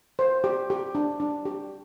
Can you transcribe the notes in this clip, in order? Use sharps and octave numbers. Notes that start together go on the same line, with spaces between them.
C5
G4
G4
D4
D4
G4